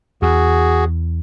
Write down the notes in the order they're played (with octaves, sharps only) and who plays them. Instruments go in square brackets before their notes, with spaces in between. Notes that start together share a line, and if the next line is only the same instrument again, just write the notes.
[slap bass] E2 [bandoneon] F#4 G#4